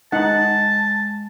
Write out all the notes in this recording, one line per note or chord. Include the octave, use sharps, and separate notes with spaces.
G#3 D#4 F#5 A5